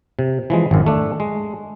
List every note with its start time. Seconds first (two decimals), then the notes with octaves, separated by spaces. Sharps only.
0.19 C3
0.50 E3 F3 G#3
0.71 G#1 F#2
0.86 A3 D4
1.20 G#3